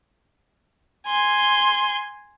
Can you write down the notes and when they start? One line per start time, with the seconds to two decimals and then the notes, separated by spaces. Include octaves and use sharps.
1.07 G#5 C6